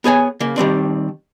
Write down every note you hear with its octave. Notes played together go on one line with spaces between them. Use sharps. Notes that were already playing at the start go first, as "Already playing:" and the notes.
B3 G#4 C#5 G#5
C#3 A#3
D#3 G3 C4 D4